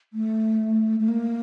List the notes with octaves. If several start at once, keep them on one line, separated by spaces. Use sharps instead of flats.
A3
A3
A#3